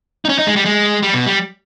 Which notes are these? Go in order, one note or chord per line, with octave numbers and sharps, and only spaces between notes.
D#4
C#4
D#4
G#3
G3
G#3
G3
B2
G3